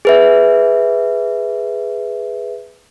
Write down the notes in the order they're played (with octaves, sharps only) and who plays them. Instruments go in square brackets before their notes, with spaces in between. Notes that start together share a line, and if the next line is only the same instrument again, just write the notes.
[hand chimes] G#4 B4 E5